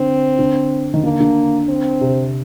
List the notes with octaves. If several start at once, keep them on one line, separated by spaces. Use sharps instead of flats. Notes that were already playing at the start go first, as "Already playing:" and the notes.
Already playing: D3 C4
D3
D#3
D3 A#3
D3
C4
C3